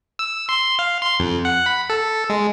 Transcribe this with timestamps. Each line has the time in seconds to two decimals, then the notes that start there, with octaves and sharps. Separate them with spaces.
0.19 E6
0.49 C6
0.79 F5
1.02 C6
1.20 F2
1.45 F#5
1.66 B5
1.90 A4
2.30 G#3